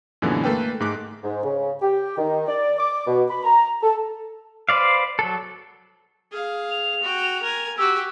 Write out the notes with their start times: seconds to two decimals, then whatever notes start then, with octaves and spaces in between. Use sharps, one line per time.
0.22 F#2 A#2 D3 E3 G#3 B3
0.44 A3 A#3 A4 B4 G5
0.80 G#2 G#3 A3 D6 F#6
1.24 G#2
1.43 C#3
1.82 G4
2.18 D#3
2.48 D5
2.79 D6
3.07 B2
3.30 B5
3.44 A#5
3.83 A4
4.69 B4 C5 D5 F5
5.19 F#3 A4
6.31 G#4 F5
6.71 F7
7.03 F#4 G5
7.43 A#4 G#5
7.78 F#4 G4 E6